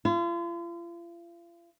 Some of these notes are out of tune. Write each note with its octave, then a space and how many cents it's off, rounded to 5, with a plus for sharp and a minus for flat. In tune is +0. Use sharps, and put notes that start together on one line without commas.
F4 -40